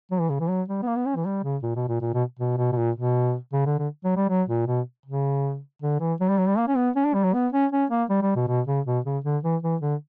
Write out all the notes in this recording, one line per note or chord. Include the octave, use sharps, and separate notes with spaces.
F#3
E3
C#3
E3
F#3
G3
B3
A#3
B3
C#4
E3
G3
C#3
A#2
B2
A#2
A#2
B2
B2
B2
B2
A#2
B2
C#3
D3
D3
F#3
G3
F#3
A#2
B2
C#3
D3
E3
F#3
G3
F#3
G3
A#3
C#4
B3
C#4
D4
G3
F#3
B3
C#4
C#4
A#3
G3
G3
B2
B2
C#3
B2
C#3
D3
E3
E3
D3